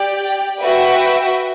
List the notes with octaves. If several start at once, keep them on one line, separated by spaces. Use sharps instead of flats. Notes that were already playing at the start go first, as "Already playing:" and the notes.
Already playing: G4 D5 G5
F#4 B4 E5 G5